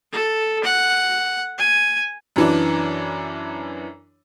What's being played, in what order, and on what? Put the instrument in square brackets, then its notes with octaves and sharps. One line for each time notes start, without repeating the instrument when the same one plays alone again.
[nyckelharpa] A4
F#5
G#5
[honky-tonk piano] F#2 E3 D4